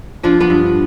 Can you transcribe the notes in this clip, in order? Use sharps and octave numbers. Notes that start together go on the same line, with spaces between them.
F3 D4 F4
B3 D4
G2